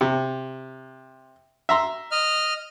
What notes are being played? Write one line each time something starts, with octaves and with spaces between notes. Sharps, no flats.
C3
E5 A#5 C6
D#5 F6